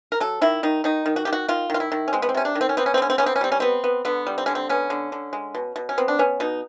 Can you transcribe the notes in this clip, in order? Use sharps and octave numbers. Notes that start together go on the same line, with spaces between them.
A#4
F#3 A4
D#3 E4
D#3 D#4
D#3 D#4
D#3
F#4
D#3 G4
F#4
D#3 F4
D#3 F4
E4
D#3
C#4
G#3 C4
B3
C4
C3 C#4
D4
D#3
C4
C#4
B3 C4
C#4
C4
D3 C#4
C4
B3 C#4
C4
C#4
G3 C4
C#4
B3 C4
B3
D3 B3
G3
C4
D3 C#4
C4
B3 C#4
D3
D3
G#3
B2
B2
C#4
B3 C4
D4
B3 C#4
B2 D#4